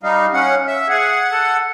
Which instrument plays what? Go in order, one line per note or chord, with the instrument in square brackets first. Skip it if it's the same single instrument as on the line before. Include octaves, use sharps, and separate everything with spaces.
[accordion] G3 D#4 [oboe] F5
[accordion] C#4 F#5
E5
[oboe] G#4 [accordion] F#5
[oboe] A4